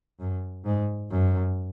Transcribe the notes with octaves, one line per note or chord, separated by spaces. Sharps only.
F#2
G#2
F#2